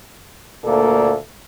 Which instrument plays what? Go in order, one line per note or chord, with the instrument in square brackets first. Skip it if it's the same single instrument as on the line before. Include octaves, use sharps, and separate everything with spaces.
[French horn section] D2 A#2 A#3 A4